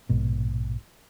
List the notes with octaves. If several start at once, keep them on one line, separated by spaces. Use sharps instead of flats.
A#1 G#2 B2